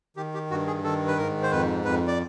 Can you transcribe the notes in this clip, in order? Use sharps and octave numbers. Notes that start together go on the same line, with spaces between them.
D#3 G4
G4
G2 F#4
G#4
D#3 A4
B4
G#2 A#4
C5
F2 B4
F2 B4
D5